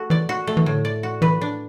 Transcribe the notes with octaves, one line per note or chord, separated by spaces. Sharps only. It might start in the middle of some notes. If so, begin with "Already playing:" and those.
Already playing: A3 F#4 A4
E3 D5
F#4
A3
E3
A2 D3
D5
F#4
E3 B4
D4